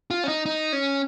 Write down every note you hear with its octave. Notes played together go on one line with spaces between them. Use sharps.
F4
C#4
D#4
D#4
C#4